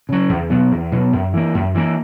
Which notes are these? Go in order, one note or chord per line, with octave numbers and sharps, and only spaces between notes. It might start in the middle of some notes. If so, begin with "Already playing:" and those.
C#3 F#3
E2
B2 F#3 B3
E2
B2 F#3 B3
F#2
E3 A#3
F#2
E3 A#3